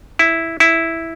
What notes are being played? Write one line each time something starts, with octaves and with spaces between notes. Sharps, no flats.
E4
E4